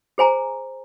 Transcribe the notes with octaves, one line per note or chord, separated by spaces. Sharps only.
G#4 C5 G#5 A#5